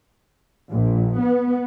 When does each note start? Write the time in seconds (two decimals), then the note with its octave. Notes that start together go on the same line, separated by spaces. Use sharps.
0.71 A#1
1.20 B3